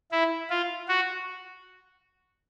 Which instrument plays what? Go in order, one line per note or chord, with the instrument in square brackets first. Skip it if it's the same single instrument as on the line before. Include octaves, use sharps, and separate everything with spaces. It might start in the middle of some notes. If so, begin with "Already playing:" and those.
[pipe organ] E4
F4
F#4